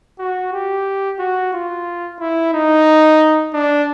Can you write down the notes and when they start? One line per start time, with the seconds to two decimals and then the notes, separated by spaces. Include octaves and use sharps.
0.19 F#4
0.52 G4
1.19 F#4
1.53 F4
2.20 E4
2.53 D#4
3.53 D4